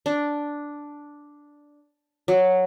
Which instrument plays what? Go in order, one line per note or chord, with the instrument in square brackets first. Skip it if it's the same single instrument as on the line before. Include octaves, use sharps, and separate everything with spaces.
[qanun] D4
F#3